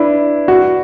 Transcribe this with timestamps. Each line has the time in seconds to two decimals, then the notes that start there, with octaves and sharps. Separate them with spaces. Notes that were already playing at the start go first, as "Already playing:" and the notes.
Already playing: D4 E4 B4
0.48 F#4